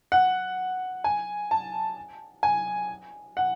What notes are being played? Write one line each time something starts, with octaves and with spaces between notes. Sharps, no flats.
F#5
G#5
A5
G#5
F#5